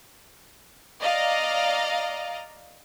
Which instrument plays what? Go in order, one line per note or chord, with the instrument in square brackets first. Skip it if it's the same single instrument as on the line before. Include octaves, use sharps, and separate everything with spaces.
[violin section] D5 D#5 F5 A#5